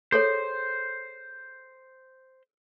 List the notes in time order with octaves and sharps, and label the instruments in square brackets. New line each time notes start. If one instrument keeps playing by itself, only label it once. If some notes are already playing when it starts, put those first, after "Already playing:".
[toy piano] G#4 A4 C#5 [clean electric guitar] C5